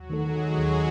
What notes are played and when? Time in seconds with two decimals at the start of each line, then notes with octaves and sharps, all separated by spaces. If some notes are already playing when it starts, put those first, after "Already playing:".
Already playing: D#2 F#3 F#4
0.10 D#3 A3 D#4 A4
0.25 G#3 G#4
0.57 D#2 G#3 G#4